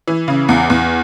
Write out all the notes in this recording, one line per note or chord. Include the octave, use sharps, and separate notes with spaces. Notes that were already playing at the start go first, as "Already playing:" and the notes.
E3
C#3
E2
E2